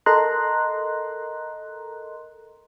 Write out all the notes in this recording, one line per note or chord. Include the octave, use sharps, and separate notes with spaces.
A4 A#4 D#5 A#5 C6 F#6